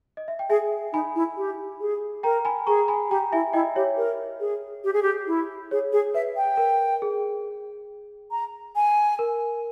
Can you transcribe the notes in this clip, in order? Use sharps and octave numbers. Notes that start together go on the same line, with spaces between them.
D#5
E5
G5
G#4 E5 G#5
D#4 G#5 B5
E4
G4
G#4
A#4 G5 A#5
G#5 B5
G#4 A#5 C#6
G#5 B5
G4 G5 A#5
E4 E5 G#5
E4 D#5 G5
G4 C#5 E5
A#4
G#4
G4
G#4
G4
E4
G#4 C#5
G#4
B4 E5
G5
A#4
G#4
A#5
G#5
A#4